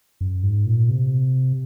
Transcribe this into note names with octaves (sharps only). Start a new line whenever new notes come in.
F#2
G#2
A#2
C3